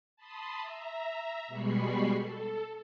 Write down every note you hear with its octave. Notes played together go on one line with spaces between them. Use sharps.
A5 B5 C6 D#6
E5 A#5
B2 G3 G#3 B5 C#6 C7
A4